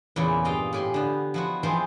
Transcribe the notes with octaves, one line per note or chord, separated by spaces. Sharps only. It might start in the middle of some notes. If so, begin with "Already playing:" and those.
E2 A#2 C#3 E4
G2 F4 D#5 F5 G5
A2 G4 G#5 C6
D3 B3
F3 E4 F#4
E3 F3 G#3 C4 B4 C5